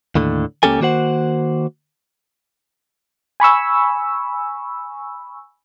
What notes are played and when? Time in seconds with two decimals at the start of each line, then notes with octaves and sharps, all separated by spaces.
0.15 D#2 A2 D3
0.63 C#2 A#3 C#4 G4 A4 G#5
0.80 D#3 A#3 F#4 C5 F#5
3.40 G#5 B5 C#6 E6